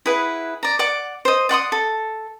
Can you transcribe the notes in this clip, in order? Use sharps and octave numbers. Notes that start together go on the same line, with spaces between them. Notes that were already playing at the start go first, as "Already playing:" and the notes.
E4 G#4 B4 F#5
D5 A#5
D5 F#5 D6
C5 D#5
D5 F#5 C6 D#6
A4